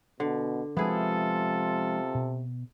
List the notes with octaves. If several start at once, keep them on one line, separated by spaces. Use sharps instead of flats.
B2 D3
C3 F3 G#3 B3 E4 F4 G#4 A4
B2